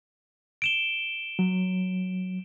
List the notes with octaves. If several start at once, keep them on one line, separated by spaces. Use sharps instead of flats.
D7 E7 G7
F#3